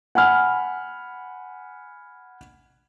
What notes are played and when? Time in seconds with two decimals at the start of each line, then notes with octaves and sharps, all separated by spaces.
0.15 F#5 G#5 B5 F6